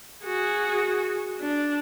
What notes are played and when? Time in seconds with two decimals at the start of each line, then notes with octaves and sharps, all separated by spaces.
0.25 F#4 G#4
1.41 D4